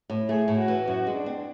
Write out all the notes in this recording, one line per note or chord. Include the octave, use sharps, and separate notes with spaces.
A2
A3 G#4
A2
F#4
E3
F#2 F#4
G#3
D4
C4